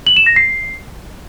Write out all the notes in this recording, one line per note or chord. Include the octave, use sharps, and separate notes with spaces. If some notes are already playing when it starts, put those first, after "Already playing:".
F#7
E7
A#6
C7